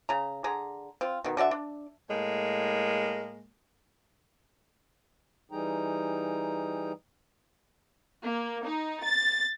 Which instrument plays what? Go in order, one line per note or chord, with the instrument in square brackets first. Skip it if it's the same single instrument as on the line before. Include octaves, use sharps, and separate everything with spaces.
[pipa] C#3 A#5
D3 G#4 A#5
C4 F4
B2 D#3
D3 F#4 D5 E5
D4
[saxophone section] A2 G#3 A#3
[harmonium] E3 G3 D#4 G#4 G5 A#5
[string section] A#3
D#4
A6